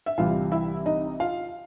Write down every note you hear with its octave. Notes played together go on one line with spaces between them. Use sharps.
E5
C2 C3 E3 G3 F4 F5
E4 E5
D#4 D#5
F4 F5